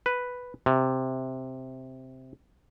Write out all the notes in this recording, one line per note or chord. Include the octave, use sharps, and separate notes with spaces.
B4
C3